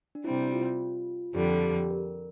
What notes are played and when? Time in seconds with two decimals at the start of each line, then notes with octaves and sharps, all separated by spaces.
0.15 D4
0.24 C3 G3 C4 E4
0.52 F4
1.35 F2 D3 G3 G4
1.49 A4
1.63 G4
1.90 A#4